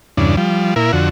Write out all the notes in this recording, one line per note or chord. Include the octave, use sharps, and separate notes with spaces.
E2 G2 C#3 D4
F3 G3
A#2 E4 A#4
F2 D3 F#4